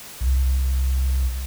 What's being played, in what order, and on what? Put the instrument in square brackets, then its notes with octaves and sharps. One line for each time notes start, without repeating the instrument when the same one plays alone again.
[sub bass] C2